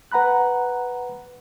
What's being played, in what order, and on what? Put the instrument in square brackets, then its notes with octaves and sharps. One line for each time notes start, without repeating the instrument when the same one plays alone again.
[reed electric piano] B4 F#5 A#5 B5 F#6